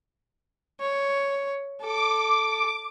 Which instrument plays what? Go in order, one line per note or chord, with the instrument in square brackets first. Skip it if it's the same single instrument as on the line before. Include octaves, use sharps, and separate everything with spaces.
[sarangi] C#5
[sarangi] A4 [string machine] D6